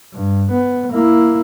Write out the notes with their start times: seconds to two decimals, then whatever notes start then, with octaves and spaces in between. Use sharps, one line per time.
0.14 G2
0.51 B3
0.92 A#3 E4